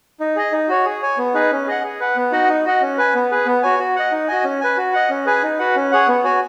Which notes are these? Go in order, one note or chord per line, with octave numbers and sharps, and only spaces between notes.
D#4
G#4 D#5
D#4
F#4 C#5
G#4
C#5 G#5
B3
D#4 G#4 B4
C#4
G#4 D#5 F#5
G#4
B4 F#5
B3
D#4 F#4 D#5 F#5
D#4
F#4 D#5 F#5
C#4
B4 G#5
B3
G#4 B4
B3
F#4 C#5 G#5
F#4
D#5 F#5
D#4
F#4 D#5 G#5
C#4
B4 G#5
F#4
D#5 F#5
C#4
G#4 B4 G#5
D#4
F#4 B4 F#5
C#4
G#4 C#5 F#5
B3
F#4 C#5 G#5